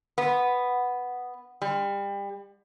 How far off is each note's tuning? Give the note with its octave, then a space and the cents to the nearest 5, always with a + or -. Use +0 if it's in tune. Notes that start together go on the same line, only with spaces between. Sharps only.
B3 +0
G3 +30